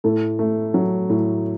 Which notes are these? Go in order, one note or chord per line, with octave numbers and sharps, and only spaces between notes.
A2 A4
A3
F#3
A2